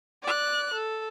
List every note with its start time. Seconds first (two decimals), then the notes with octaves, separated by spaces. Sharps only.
0.23 D5 F#6
0.74 A4